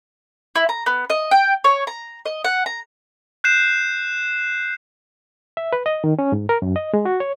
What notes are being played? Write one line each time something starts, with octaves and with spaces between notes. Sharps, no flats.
E4
A#5
B3
D#5
G5
C#5
A#5
D#5
F#5
A#5
F#6 G6 C7 E7
E5
B4
D#5
D#3
C#4
G#2
A#4
F#2
D#5
G#3
F#4
C#5